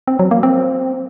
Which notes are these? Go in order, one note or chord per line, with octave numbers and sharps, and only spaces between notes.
C4
F#3
A#3
C4